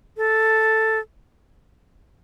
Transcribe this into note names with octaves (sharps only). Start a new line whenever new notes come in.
A4